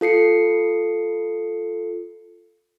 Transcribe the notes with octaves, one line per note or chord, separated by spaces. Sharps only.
F4 A4 C7 C#7